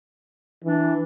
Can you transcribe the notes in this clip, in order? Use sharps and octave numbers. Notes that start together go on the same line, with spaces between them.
E3 D4